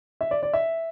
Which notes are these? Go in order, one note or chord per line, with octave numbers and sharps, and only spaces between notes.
E5
D5
D5
E5